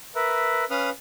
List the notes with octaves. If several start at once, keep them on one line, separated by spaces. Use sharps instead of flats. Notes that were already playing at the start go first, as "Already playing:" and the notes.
A#4 B4 E5
C#4 B4 F5 D#6 F6